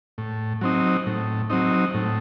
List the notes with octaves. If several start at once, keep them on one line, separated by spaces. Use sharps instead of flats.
A2
F#3 C4 D#4
A2
F#3 C4 D#4
A2